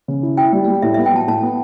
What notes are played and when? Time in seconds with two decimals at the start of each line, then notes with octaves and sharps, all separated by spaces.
0.08 C#3
0.23 E4
0.37 E4 G5
0.53 G3
0.68 G3
0.82 A2 E5
0.94 B3 E5
1.06 G5
1.12 F#3 A5
1.28 A2 A5
1.43 B3